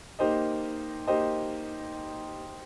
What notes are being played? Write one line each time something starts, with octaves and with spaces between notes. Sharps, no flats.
A#3 D#4 G4 C5 D#5
A#3 D#4 G4 C5 D#5